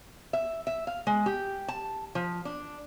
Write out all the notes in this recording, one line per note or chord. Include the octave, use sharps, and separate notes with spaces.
E5
E5
F5
G#3
G4
A5
F3
D4